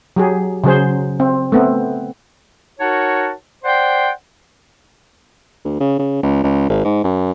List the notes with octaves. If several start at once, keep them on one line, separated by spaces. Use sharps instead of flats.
F#3 G4 G#4
C#3 F#3 G#4 C5
C4
A3 B3 C4
D#4 F#4 A#4 C#5 F#5 A5
C5 D5 F#5 G5 C6
D2
C#3
C#3
C#2
C#2
G#1
G#2
F#2